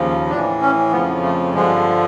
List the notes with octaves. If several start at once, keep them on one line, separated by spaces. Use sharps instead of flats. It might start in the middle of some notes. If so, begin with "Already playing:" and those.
Already playing: D#2 C#3 F3
A2 E3 D4
C#4
F2 C#3 F3 B3
A3
G2 D3 F3 G#3